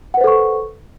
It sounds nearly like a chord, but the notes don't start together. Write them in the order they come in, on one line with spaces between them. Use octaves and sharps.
F#5 B4 C5 A4 C#6